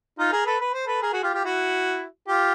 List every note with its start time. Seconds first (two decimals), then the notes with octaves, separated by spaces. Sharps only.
0.19 D#4 F4
0.32 G#4 A#4
0.46 A4 B4
0.61 B4
0.73 C5
0.86 A4 B4
1.02 G#4 A#4
1.13 F#4 G#4
1.23 F4 G4
1.34 F4 G4
1.45 E4 F#4
2.28 F4 G4